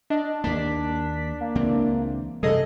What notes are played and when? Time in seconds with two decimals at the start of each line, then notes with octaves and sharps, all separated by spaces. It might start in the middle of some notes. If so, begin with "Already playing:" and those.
0.10 D4 D#5
0.44 D#2 A#3 D4 B6
1.40 A#3
1.55 C#2 E3 C4
2.43 F#2 C3 G3 G#4 A4 D#5